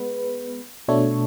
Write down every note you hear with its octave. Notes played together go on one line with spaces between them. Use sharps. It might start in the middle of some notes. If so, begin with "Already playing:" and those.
Already playing: G#3 B3 B4
B2 A3 D4 A4 C#5